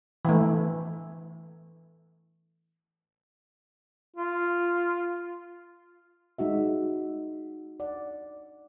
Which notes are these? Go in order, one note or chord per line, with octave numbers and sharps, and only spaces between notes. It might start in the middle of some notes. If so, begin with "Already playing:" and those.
E3 A3
F4
G#3 D#4 F#4 E5
D5 F#5